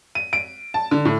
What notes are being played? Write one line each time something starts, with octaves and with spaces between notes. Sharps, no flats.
D#7
D7
A5
D3
A2